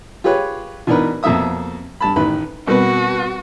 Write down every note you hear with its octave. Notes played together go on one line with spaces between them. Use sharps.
F4 G4 G#4 B4 C#5
B2 E3 D4 D#4 A#4 B4
F2 B2 A#3 A4 E5 D#6
G2 A5 B5
A1 D#3 B4 B5
B2 G3 C4 F#4 A#4 B4